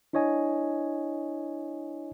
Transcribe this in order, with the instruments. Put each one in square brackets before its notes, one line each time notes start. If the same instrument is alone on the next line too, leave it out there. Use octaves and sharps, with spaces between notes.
[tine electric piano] D4 E4 C#5 D#5 G#5